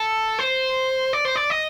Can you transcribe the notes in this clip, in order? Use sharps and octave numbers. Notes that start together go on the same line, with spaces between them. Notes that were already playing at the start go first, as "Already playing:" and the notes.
Already playing: A4
C5
D5
C5
D5
D#5